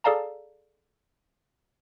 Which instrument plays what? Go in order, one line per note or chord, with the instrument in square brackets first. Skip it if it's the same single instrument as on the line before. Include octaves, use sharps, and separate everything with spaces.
[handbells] G#4 A4 D5 F5 A5 A#5